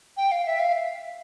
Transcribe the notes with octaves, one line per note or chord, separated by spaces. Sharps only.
G5
F5
E5
F5